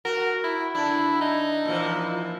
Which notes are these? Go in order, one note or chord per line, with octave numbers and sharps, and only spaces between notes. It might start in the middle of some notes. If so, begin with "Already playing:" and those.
F#4 A#4
E4
D3 D4 E4
D#4
A#2 E3 F3